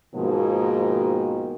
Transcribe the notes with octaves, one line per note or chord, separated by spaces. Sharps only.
G#2 B2 D#3 F3 A#3